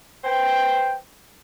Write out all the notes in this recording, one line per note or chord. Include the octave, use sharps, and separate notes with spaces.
B4 C5 G5